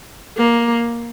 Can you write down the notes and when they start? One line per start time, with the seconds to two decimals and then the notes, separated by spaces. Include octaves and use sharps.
0.37 A#3